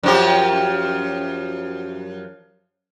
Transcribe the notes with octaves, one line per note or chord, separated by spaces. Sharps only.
F#2 F3 G4